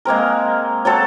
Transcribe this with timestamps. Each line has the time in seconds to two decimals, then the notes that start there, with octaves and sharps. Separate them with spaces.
0.05 G#3 A#3 C4 A#4
0.85 F#3 C4 A4